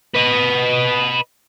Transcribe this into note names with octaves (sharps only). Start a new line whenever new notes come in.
B4 D#5